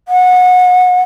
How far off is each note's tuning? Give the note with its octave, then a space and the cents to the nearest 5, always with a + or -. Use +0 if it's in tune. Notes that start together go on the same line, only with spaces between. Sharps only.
F#5 -25